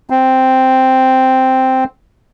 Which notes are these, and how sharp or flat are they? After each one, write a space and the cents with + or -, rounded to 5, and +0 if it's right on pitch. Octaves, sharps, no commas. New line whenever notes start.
C4 -5